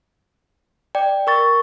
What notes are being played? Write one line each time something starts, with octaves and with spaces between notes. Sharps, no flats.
D5 G5
A#4 C#6 A6